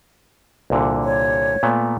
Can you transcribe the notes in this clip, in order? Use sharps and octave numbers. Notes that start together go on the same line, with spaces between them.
C2 A#2 D3
C#5
A#2 A3 B3